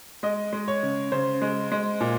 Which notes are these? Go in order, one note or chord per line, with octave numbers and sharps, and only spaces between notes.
G#3 D#5
G#3
C#5
C#3
C#3 C5
G#3
G#3
A#2